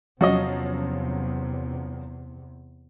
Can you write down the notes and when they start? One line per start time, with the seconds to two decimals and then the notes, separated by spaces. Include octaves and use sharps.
0.21 E2 C3 F3 F#3 C#4 F#4 D#5